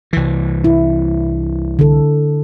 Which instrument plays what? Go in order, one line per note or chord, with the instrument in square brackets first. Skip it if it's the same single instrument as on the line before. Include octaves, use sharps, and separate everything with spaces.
[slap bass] C2 E3
[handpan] E4
D3 A4